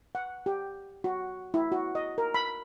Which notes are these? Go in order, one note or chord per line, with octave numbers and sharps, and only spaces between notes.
F#5
G4
F#4
E4
F#4
D#5
A#4
B5